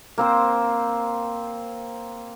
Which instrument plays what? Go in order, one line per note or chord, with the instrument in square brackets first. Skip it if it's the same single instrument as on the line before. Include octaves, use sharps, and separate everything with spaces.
[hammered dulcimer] A#3 C4 C5